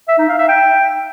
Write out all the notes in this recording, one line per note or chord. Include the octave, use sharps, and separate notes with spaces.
E5
D#4
F5
E5
G5